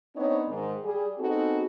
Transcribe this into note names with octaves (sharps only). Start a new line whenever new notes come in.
B3 C4 D4 D#4 C#5
G#2 D#3
G3 G#4
B3 C4 D#4 F#4 G#4 A4